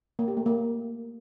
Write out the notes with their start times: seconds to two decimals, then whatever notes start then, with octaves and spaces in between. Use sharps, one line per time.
0.19 A#3
0.28 G4
0.37 A3
0.46 A#3